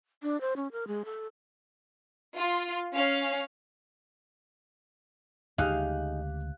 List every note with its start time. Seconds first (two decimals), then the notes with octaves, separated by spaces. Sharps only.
0.23 D4
0.41 C5
0.56 C#4
0.72 A#4
0.88 G#3
1.05 A4
2.38 F4
2.95 C#4 F5
5.58 D2 C#3 G#3 D#4 G4 G#4 F5 F#6